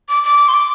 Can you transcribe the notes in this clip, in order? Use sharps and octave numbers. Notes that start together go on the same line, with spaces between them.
D6
D6
C6
D6